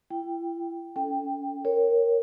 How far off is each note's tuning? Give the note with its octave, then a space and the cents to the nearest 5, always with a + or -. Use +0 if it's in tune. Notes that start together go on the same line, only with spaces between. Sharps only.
E4 +40 G5 +0
C#4 +35 A4 +0 G5 +0
A#4 +0 C#5 -5